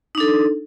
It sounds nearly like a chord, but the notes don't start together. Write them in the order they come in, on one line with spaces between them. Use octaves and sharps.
D#4 D4 A4